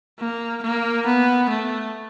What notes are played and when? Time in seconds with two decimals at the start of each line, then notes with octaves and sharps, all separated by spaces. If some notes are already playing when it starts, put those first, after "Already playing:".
0.19 A#3
0.62 A#3
1.06 B3
1.49 A3